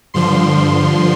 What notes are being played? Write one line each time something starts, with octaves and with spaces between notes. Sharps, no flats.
G2 D3 F3 C6